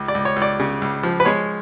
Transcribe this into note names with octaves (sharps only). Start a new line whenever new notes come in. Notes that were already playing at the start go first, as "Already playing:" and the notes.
Already playing: C#2
D5
C#2
C#5
C#2
D5
C#3
C#2
F3
B4
G#3 C#5